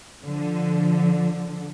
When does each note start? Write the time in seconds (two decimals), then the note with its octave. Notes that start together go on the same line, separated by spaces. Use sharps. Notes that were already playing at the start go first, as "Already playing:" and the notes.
0.23 D3 F3